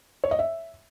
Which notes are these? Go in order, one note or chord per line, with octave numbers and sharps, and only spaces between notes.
C#5
D#5
E5